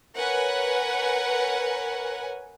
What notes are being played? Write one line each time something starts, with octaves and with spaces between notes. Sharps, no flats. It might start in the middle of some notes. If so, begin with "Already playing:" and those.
A#4 B4 C#5 F#5 G#5